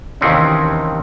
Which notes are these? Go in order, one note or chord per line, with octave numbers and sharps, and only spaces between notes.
D#2 C3 D#3 E3 C4 C#4